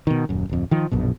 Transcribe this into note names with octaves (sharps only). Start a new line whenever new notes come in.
B2 D#3
D#1 F#2
D1 F2
D#3 F3
A#1 F#2 B2